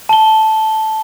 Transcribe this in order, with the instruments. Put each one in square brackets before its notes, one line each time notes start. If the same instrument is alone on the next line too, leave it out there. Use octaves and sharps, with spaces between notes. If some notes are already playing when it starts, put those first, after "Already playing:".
[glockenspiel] A5 G7